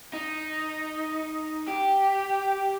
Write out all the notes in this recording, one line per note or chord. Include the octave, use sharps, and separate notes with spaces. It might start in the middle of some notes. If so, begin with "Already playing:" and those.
D#4
G4